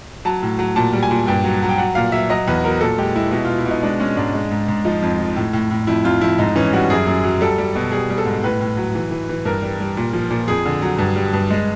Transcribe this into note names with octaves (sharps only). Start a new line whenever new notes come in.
F#3 A5
A2
F#3
A#2 A5
G3
G#5
A#2
G2 G5
F#3
F#3
G5
F#3 F#5
A#2 F5
F#3 E5
F#3 D#5
E2 B4
F#3 A#4
A#2 A4
G#3 G4
G#3 E4
B2 E4
B2 F4
E4
B2 D#4
G#3 D4
G#3 C#4
G#2 D4
G#3
G#2
G#2
F3 D#4
F2
F3
A2
A2
A2
F2 E4
F2 F4
F2 E4
G#2 D#4
E3 C#4
G3 F#4
F#2 G#4
F#2
F#3
G3 A4
G3
B2
G3 G#4
G3
A4
G#2
A2 B4
A2
F#3
E3
E3
E3
G2 A#4
G3
G3
A#2
F3
A#2
F2 G#4
D3
F#3
G2
G3
G2
G#3